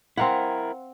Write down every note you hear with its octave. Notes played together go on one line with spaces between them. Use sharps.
C4 E4 A#4 F5 F#5